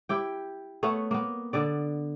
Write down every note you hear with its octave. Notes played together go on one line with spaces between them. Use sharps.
E4 G4 G5
A3 B3 C#5 F#5
A#3 B3
D3 B3 D5